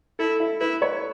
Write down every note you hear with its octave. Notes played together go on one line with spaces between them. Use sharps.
E4 A4
E4
E4 B4
C#5